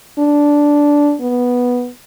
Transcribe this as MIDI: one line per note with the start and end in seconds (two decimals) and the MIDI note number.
0.19 1.15 62
1.21 1.89 59